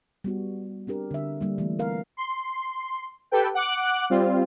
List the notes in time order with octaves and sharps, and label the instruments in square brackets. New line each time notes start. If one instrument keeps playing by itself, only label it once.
[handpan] G3 B3 F#4
C4 D4 G4 A#4
D3 E5
G3 A#3
E3 A3 B3
C4 A#4 F5
[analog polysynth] C6
G4 A4 B4 G5
F#5 D6 F#6
G3 C4 F4